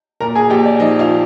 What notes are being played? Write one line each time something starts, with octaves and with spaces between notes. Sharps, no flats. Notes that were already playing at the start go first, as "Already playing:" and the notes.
A#2 A#4 A#5
G#4 G#5
A#1 G4 G5
D5
F3 D#4 D#5
F4 F5